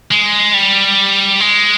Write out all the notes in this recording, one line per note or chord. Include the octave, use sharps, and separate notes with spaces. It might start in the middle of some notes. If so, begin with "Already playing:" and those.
G#3
G3
G#3